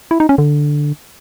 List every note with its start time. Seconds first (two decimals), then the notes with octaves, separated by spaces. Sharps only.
0.11 E4
0.20 D#4
0.29 C#4
0.38 D3